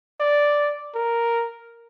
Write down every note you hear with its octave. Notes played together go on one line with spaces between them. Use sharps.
D5
A#4